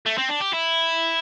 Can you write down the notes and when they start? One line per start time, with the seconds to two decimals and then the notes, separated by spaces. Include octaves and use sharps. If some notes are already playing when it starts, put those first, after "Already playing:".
0.06 A3
0.18 C4
0.29 D4
0.41 G4
0.54 E4